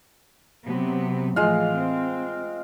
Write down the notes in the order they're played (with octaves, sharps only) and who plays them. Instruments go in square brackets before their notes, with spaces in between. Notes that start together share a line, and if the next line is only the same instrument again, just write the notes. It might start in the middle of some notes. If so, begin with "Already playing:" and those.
[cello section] C3 F#3 B3
[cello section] A2 E3 F3 [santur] G#3 F4 F5
[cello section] C4